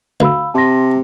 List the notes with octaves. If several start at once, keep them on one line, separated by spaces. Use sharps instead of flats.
D2 F5 B5 E6
C3 A5 C6 A#6